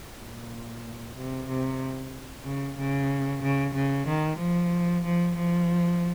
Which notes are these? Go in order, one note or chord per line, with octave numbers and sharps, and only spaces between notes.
A#2
C3
C3
C#3
C#3
C#3
C#3
D#3
F3
F3
F3